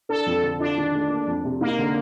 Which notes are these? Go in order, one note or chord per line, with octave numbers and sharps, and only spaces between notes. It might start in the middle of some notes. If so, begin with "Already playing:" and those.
D4 A4
F2
D3
D4 F4
D#3
A3
A#3
F2
C3
A#3 D#4
D3